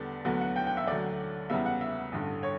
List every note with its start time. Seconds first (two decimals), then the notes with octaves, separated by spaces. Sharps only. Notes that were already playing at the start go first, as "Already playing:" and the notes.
Already playing: E2 D3 G3 B3 D5
0.25 D2 D3 F#3 B3
0.41 F#5
0.56 G5
0.67 G5
0.77 E5
0.87 D2 D3 F#3 D5
1.50 E2 C#3 G3 B3 E5
1.66 F#5
1.81 E5
2.12 A1 G2 D3
2.43 C#5